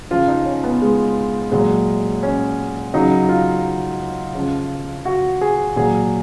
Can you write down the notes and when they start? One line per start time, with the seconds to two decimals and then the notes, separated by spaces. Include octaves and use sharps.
0.11 C#3 F3 F4
0.28 D#4
0.46 C#4
0.64 B3
0.82 G#3
1.52 A#2 F#3 G#3
2.23 C#4
2.94 C#3 F#3 D#4
3.29 F4
4.35 C#3 F3
5.05 F#4
5.41 G#4
5.76 A#2 F#3 G#4